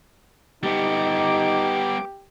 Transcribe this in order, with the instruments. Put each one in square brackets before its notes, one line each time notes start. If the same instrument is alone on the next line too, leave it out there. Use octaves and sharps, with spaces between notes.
[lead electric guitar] G3 B3 [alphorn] D#4 [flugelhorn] G4 [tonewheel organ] D6